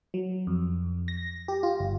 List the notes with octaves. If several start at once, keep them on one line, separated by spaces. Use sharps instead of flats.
F#3
F2
A#6
G4
F4
G1